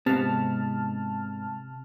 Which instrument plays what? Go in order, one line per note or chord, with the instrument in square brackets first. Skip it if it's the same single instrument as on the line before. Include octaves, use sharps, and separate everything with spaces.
[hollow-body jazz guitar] G#2 B3 [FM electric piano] C3 A5 F6